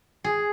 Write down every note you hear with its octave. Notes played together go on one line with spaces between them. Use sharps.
G#4